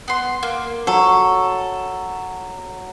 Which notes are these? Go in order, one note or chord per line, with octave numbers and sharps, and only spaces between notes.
B3 C6
A#3
F#3 A4